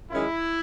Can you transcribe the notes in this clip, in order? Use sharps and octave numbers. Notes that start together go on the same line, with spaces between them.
F#2 D#3 G#3 C#4 E4